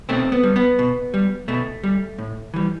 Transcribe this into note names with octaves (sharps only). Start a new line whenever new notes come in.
B2 A3 C4
B3
G3
B3
B2
G3
B2 A3
G3
A2
E3 G3